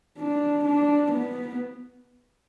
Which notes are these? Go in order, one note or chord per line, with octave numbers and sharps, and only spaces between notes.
D4
D4
B3